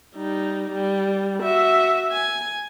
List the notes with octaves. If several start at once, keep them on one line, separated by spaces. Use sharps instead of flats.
G3 D#4
G3
F#4 E5
G#5